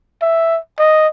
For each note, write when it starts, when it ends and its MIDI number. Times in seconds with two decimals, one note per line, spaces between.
0.22 0.58 76
0.79 1.08 75